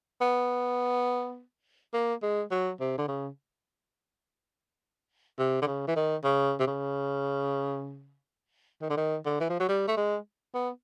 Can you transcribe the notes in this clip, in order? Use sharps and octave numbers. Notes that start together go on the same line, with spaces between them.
B3
A#3
G#3
F#3
C3
D3
C#3
C3
D3
C#3
E3
D#3
C#3
C3
C#3
D#3
D3
D#3
D3
E3
F3
F#3
G3
A3
G#3
B3